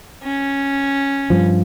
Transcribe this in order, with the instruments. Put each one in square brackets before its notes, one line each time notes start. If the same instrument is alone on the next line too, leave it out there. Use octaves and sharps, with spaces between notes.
[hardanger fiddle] C#4
[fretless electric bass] G2 F3